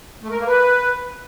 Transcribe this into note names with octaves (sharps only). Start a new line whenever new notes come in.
A3
A#4
A#3
B4